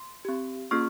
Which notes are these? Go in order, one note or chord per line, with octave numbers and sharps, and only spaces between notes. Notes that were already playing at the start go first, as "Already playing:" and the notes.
Already playing: C6
C4 G4
A#3 C#4 F4 G#4 C#6 F6